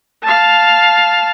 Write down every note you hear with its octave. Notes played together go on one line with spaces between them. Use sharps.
F5 A5